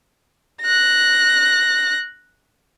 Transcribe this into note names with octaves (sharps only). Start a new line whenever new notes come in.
F#6 A#6